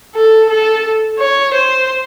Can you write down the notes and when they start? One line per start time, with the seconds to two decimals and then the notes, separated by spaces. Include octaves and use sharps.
0.15 A4
0.49 A4
1.19 C#5
1.54 C5